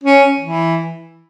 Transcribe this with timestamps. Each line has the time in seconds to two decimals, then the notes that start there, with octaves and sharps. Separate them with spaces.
0.04 C#4
0.40 E3